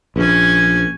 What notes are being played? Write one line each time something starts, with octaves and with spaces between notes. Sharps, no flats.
A#1 C#4 G#5